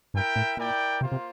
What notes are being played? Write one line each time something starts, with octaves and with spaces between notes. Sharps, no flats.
G2 E4 A#4 E5 G5
A2
A#2 E4 A#4 D5 G5
C3 A#3 F4 C5
C3